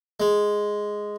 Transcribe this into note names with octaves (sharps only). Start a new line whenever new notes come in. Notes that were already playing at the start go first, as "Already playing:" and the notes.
G#3